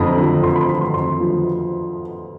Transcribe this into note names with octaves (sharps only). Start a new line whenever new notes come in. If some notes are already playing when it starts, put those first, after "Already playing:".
Already playing: F2 D3 F3 A#5 B5
D3 F3
F2 C6
B5
D3 F3 B5
C6
F2 C6
D3 F3